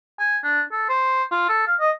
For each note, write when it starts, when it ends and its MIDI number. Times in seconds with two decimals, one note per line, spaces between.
0.19 0.37 80
0.44 0.62 62
0.72 0.85 69
0.89 1.24 72
1.31 1.45 65
1.49 1.65 69
1.67 1.75 77
1.80 1.91 75